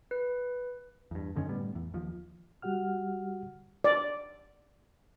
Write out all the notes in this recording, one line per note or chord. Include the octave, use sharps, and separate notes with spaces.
B4
E2 G2
F#2 D3 D#3 C#4
A2 G3 B3
E2
D#2 F3
G3 F#4 G4 F#5 F6
D5